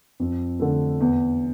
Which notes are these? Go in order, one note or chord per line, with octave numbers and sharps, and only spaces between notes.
F2
D3 A3
E2